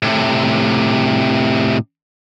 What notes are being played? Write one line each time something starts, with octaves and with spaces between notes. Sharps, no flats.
A2 C3